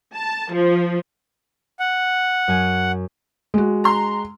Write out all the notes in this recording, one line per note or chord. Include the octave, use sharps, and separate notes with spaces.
A5
F3
F#5
F#2 G#5 D7
G#3 F#4
A#5 C6